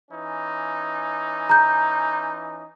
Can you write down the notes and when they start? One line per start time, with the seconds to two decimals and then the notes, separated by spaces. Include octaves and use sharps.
0.10 E3 C#4 D#4
1.49 A#5 G6